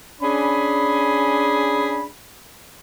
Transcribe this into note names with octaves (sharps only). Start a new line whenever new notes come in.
C#4 D4 G#4 B5